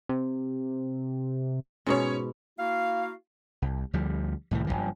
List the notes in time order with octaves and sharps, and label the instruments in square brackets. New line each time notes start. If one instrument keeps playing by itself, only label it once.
[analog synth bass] C3
[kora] G#2 B2 [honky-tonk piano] C#4 C#5
[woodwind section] A#3 E4 F#4 F5
[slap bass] C2
D2 F3 G3
C2 A2 D#3 E3
F#1 E2 G2 F3